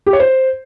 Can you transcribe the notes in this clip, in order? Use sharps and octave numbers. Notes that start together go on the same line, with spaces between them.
G4
C#5
C5